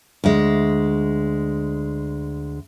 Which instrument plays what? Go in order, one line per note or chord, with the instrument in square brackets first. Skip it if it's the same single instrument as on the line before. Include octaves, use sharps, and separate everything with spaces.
[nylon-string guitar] D2 G#3